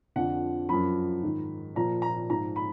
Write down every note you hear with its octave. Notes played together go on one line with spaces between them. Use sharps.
F2 D3 F3 F#5
F#2 F3 B5
G#2 D#3
A#2 F3 A#5
A#5
G#2 F3 A#5
B5